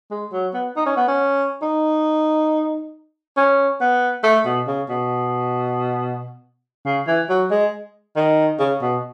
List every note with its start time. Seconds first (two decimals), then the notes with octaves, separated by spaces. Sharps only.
0.11 G#3
0.32 F#3
0.54 B3
0.76 D#4
0.86 C#4
0.96 B3
1.08 C#4
1.62 D#4
3.37 C#4
3.81 B3
4.23 A3
4.46 B2
4.67 C#3
4.89 B2
6.86 C#3
7.07 E3
7.29 F#3
7.51 G#3
8.16 D#3
8.59 C#3
8.82 B2